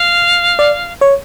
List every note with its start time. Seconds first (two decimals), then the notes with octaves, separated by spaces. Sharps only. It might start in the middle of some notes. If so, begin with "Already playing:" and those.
Already playing: F5
0.59 D5
1.01 C#5